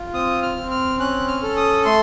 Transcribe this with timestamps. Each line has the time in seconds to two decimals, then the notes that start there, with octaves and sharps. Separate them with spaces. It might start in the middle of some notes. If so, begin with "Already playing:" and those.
Already playing: F4
0.14 C4 D#6
0.43 F6
0.57 C4
0.71 F6
0.99 C#4 F#6
1.28 F6
1.42 A4
1.57 D#6
1.85 A3 C6